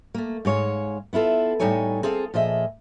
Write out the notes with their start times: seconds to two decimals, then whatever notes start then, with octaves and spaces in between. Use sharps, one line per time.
0.14 A3 A#3
0.45 G#2 G#3 C#5 F5
1.13 B3 E4 F4 A4
1.60 A2 G3 D#4 A4 C#5 G#5
2.03 C4 G#4 A4 F5
2.34 A#2 F3 G#4 D#5 E5